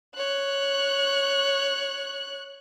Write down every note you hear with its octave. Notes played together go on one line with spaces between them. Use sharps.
C#5 F#6